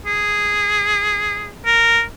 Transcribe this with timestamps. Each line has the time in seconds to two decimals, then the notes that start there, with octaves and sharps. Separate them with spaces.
0.06 G#4
1.66 A#4